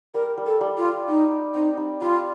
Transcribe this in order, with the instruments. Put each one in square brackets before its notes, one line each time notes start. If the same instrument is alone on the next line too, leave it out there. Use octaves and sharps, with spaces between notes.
[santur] G3 [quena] A#4
[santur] G3
[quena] A4
[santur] G3
[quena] F4
[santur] G3
[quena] D#4 [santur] G4
[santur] G4
[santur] C4 [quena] D#4
[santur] G3
[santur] G3 [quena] F4